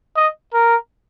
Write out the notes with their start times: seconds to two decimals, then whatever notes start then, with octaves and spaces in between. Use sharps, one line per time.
0.16 D#5
0.53 A#4